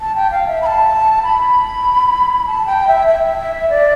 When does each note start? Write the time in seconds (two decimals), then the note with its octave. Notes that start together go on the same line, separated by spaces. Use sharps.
0.01 A5
0.16 G5
0.31 F5
0.47 E5
0.62 B5
0.66 A5
1.23 B5
2.47 A5
2.66 G5
2.88 E5
3.07 E5
3.70 D5